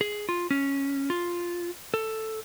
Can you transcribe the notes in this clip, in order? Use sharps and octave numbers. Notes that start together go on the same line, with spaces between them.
G#4
F4
C#4
F4
A4